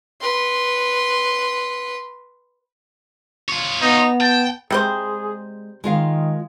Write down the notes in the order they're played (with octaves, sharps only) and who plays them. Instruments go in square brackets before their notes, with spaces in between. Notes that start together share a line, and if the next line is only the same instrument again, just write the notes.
[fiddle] B4 C6
[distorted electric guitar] F4 C#5
[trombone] B3 [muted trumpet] D#4
[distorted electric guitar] G5 [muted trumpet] A5
[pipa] C3 G3 C5 [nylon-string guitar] G#3 [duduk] G#4
[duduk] D#3 [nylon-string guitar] G#3 F4 F5